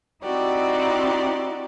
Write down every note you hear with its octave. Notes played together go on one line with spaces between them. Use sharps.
C4 D#4 E4 F#4 G4 D5